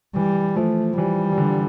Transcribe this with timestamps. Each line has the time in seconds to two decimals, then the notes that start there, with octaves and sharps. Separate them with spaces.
0.16 E3 G3
0.56 F3 A3
0.97 E3 G3
1.32 E3
1.38 D3